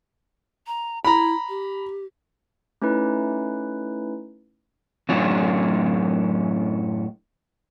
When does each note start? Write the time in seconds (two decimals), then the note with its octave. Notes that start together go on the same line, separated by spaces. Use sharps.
0.67 A#5
1.05 E4 A#5 B5
1.49 G4
2.82 A3 C#4 D#4 E4 B4
5.09 F#2 A2 F#3 C#4 D4 F4